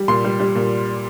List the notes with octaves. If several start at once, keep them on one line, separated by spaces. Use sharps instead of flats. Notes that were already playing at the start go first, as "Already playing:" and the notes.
Already playing: G3
A#2 C6
G3
G3
A#2